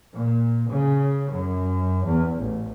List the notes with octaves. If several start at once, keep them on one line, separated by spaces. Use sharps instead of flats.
A#2
C#3
F#2
E2
A1